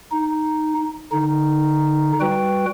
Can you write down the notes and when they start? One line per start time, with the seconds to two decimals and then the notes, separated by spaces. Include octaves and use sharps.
0.11 D#4
1.12 D3 D#4
2.21 G3 F#4 B4 G5